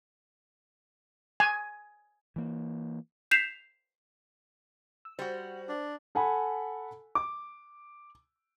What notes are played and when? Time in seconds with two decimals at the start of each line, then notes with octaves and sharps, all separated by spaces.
1.40 G#5
2.36 E3 A#3
3.31 G6 B6 C7 E7 F7
5.05 E6
5.19 G3 F#4 C5
5.69 D4
6.15 A4 F#5 G#5 B5
7.15 D6